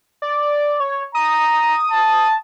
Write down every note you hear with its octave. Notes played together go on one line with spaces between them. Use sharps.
D5
C#5
A#5 D#6
A5